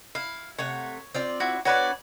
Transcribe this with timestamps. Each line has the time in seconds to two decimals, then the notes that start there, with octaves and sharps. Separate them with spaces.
0.15 E4 F5
0.59 C3 A3 C#5 F#5
1.14 C4 F4 D5
1.40 E4 F#4
1.65 B3 D4 F#4 B4 C#5 D5